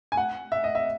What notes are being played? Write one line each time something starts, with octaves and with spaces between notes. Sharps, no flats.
G#5
F#5
E5
D#5
E5